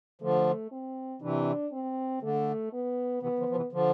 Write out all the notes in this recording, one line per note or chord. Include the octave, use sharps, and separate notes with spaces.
D3 F3 A3
C4
C3 E3 D4
C4
D3 A3
B3
C3 E3 B3
D3 F3
F3
C3 E3
D3 F3